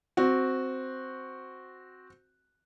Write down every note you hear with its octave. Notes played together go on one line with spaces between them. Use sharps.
C4 F#4